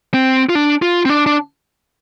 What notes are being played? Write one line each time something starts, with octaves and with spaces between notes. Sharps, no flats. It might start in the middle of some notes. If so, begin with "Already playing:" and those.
C4
F4
D4
F4
C4
D4
D4